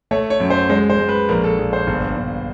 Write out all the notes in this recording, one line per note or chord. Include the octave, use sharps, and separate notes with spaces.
A3 C#5
C#5
F#2
C5
G#3 C5
C5
G#3
B4
A#1 A#4
A4
A#1
C5
G1
G1